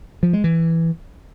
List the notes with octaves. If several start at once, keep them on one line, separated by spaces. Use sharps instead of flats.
F3
G#3
E3